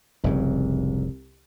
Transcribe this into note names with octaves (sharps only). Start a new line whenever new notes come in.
F1 C2 G#2 C#3